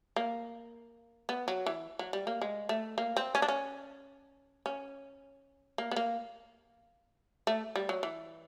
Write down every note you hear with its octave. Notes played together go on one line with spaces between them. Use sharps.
A#3
B3
F#3
E3
F#3
G3
A#3
G#3
A3
A#3
C4
C#4
D4
C#4
C#4
A#3
B3
A#3
A3
G3
F#3
E3